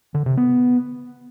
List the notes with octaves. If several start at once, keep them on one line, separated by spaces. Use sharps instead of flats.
D3
C3
B3